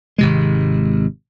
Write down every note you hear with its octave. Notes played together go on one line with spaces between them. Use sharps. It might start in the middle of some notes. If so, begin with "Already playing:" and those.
G#1 C3 G#3